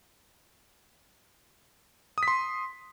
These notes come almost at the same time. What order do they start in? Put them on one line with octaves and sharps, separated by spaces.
D#6 B6 C6